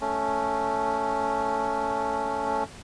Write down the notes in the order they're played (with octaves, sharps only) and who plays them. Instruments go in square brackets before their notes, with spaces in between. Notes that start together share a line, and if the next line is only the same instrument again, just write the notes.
[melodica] A3 C#4